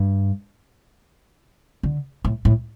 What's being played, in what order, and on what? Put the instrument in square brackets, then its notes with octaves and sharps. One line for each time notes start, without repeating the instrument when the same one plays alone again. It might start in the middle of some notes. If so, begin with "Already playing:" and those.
Already playing: [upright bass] G2
D3
A2
A2